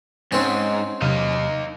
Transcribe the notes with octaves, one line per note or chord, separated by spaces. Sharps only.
G#2 C4 C#4
E2 C3 F#3 D#4 F5